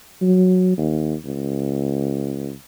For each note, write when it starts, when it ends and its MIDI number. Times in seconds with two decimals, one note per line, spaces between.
0.22 0.77 54
0.78 1.14 39
1.25 2.52 37